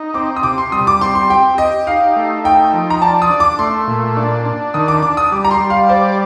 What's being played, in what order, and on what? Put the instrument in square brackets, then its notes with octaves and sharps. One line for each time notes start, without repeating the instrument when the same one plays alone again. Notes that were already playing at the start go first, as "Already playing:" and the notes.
Already playing: [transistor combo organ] D#4
[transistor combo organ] C4 [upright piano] D6
[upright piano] D#6
[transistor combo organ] C3 [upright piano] D6
[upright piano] C6
[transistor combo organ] G3 [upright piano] D#6
[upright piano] D6
[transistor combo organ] C4 [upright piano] C6
[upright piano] C6
[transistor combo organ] G4 [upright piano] G5
[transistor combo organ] G4 [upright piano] D#5
[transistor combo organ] D#4 [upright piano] F5
[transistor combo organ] A3
[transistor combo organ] D#4 [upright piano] G5
[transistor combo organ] F3
[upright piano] A#5
[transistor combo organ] D5 [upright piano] A5
[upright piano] D#6
[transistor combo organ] D4
[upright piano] D6
[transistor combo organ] A3 [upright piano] C6
[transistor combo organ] A#2
D4
D4
[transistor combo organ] D#3 [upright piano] D#6
[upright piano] D6
[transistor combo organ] D4 [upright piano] D6
[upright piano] D#6
[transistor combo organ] G3 [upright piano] D6
[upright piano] A#5
C6
[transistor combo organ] G3
[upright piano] F5
[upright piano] C5 [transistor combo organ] D5